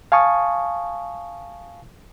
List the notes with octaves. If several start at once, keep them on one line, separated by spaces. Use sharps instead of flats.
F5 G#5 A5 C#6 D#6